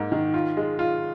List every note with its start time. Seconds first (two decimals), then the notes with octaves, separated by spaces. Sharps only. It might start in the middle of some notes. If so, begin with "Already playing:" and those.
Already playing: G#2 A#3
0.12 D#3
0.34 F4
0.57 G#3
0.79 F4